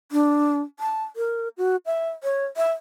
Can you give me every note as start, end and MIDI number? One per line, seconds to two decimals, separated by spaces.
0.12 0.61 62
0.80 1.03 81
1.16 1.48 70
1.58 1.76 66
1.86 2.09 76
2.24 2.46 73
2.57 2.72 76